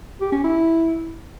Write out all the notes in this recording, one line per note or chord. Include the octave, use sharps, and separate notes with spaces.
G4
C#4
E4